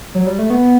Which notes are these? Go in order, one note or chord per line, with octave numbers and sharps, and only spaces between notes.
F#3
G3
A3
B3